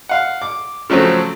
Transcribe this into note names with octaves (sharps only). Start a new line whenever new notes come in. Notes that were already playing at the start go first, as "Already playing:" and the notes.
F5 F#5
D6
C#3 F3 F#3 A3 C4